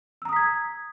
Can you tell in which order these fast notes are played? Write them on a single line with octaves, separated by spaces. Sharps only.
E6 A#5 D#6 B6 G#6